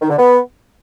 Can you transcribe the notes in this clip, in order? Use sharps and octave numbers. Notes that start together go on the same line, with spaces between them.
D#3
D3
B3